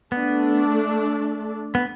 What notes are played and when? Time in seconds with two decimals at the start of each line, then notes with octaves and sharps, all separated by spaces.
0.12 A3 B3 D4 A4
1.75 B3